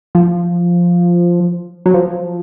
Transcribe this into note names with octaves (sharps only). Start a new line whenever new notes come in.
F3
F#3
F3